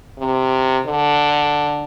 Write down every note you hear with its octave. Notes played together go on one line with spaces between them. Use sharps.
C3
D3